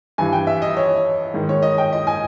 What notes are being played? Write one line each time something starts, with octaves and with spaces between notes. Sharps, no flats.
G2 E3 G#5
G5
E5
D#5
C#5
G#2 D#3
C#5
D#5
G5
D#5
G#5